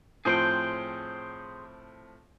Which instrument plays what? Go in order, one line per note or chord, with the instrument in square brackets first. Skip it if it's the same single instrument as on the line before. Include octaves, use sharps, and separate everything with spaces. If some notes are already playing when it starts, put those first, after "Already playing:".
[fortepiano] A2 F3 C4 [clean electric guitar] G#4 C5 G5